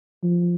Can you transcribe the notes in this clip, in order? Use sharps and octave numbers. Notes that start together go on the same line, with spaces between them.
F3